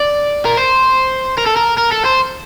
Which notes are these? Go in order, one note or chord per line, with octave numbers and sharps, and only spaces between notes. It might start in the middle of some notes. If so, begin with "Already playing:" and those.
Already playing: D5
A#4
C5
A#4
A4
A#4
A#4
A4
C5